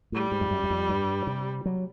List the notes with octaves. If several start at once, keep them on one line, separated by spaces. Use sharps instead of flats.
A2 G3
G#2
F2
F#2
F#2
F2
G2
C3
F#3